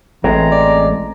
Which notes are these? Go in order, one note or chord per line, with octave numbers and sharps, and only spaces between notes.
A1 E3 G#3 C4 A#5
D5